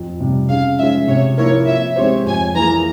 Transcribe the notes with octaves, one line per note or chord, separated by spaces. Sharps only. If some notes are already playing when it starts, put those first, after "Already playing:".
Already playing: F2
C3 G3
C#3 F5
F3 G#3 C#4 E5
C3 C#5
F3 A#3 E4 A#4 C#5
F3 E5
G#3 C4 G4 C5 C#5
F2 G#5
E3 A#3 E4 G#4 A#5